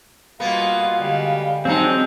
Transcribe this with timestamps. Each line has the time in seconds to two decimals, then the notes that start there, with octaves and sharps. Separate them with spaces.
0.40 B2 G3 A#3 B3 F4 F5 G#6
0.96 D3 G3 G#3
1.65 F#3 G#3 C4 D4 D#4